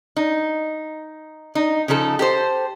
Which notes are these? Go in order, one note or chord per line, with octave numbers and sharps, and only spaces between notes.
D#4
D#4
C#3 F3 D#4 A4
G4 A4 C5